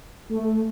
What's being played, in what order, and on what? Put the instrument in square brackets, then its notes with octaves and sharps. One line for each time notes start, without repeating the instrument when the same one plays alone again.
[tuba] A3